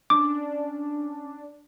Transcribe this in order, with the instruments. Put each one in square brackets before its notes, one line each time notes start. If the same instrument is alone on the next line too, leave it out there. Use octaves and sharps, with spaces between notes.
[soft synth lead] C#4 [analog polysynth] D4 [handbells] D6